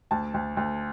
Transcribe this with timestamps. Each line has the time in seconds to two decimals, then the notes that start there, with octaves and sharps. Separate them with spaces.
0.11 D2 A5
0.34 D2
0.57 D2